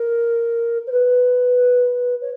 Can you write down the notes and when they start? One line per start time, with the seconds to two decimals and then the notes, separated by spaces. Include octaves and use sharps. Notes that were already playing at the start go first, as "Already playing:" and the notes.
Already playing: A#4
0.86 C5
0.91 B4
2.21 C#5